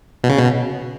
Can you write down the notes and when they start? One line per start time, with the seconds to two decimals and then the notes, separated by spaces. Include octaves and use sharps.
0.24 B2
0.29 C#3
0.39 B2